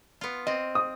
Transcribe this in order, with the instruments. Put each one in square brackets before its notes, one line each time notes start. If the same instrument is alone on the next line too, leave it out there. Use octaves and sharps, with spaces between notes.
[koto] B3 F4
[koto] C4 [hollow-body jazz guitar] D#5
[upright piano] D#6